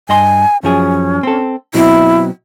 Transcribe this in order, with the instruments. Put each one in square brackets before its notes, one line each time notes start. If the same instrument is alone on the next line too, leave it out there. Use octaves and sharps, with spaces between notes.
[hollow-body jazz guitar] G2 D#5 C6 [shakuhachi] G#5
[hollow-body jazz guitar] F#2 F3 G#4 [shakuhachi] C#4
[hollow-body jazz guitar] C4 A4
[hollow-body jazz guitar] B2 F#3 C4 [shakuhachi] E4